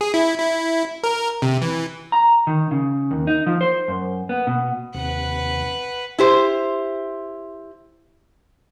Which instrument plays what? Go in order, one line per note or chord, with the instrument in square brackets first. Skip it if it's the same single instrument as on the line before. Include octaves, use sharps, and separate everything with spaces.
[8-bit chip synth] G#4
E4
E4
A#4
C3
E3
[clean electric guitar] A#5
D#3
C#3
D#2
D#4
F3
C5
F#2
B3
B2
[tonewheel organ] D#2 C3 [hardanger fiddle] B4 F#5
[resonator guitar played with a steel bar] E4 G4 C5